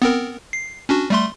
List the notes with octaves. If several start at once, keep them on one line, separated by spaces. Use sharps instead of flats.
B3 C4 A#4
C7
C#4 D4 F#4
G3 A3 C6